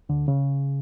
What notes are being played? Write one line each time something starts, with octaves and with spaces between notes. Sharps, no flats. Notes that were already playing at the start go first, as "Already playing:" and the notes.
D2 D3
C#3